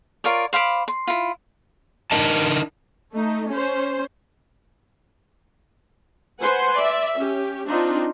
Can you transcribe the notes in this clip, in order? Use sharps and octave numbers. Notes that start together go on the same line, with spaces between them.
F4 A#4 C#5 D5
C5 F5 B5 D6
C6
E4 F4
D4 D#4 A#4 D#5 A5
A3 D#4
C#4 C5
B4 C5 F#5 G#5 C6
D5 E5
C#4 G4
C4 D4 D#4 F4